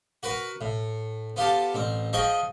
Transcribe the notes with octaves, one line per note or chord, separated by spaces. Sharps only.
F#4 A#4 B4
A2
B3 F4 G4 A4
A1 C4
F3 G#4 D#5 G5 C#6